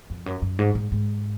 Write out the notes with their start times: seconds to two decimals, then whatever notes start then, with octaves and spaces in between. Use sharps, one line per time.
0.10 F2
0.26 F#2
0.42 F#2
0.59 G#2
0.75 G#2
0.92 G#2